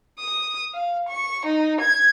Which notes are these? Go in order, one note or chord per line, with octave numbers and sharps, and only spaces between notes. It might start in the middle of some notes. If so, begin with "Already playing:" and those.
D#6
F5
C#6
D#4
G#6